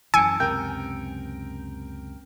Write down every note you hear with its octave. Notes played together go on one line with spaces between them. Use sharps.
F#2 E3 G#5 A5 E6 C#7 D7
C#2 F#2 C3 A#4 G5 G6